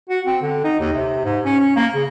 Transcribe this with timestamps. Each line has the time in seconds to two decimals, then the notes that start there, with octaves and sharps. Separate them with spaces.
0.09 F#4
0.27 C4
0.42 D3
0.64 D#4
0.80 D#2
0.93 C3
1.25 G#2
1.45 C#4
1.60 C#4
1.76 A#3
1.94 C#3